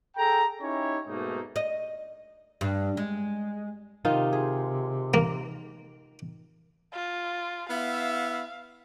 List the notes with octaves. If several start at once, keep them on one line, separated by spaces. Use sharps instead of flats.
G#4 A4 G5 A#5
C#4 D#4 E4 G4 C#5
G#2 B2 A3 A#3 D#4
D#5
G2
G#3
C3 D#3 D#4 F4
G#4
A#3
F4
B3 E4 E5 F5